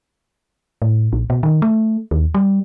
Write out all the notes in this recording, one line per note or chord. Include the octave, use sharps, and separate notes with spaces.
A2
A#1
B2
D#3
A3
D#2
G3